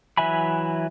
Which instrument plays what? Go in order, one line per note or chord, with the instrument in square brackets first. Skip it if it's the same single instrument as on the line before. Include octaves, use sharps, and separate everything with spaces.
[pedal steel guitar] E3 F#3 E5 G#5 B5